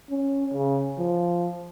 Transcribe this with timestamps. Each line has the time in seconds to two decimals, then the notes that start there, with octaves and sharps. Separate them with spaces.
0.10 C#4
0.54 C#3
0.99 F3